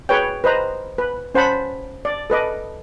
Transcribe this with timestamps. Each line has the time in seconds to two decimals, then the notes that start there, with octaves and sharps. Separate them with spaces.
0.09 G#4 B4 C#5 G5
0.44 B4 C5 D#5 A#5
0.98 B4
1.35 C#4 C5 F#5 A5 B5
2.05 D5
2.30 A4 B4 D#5 D6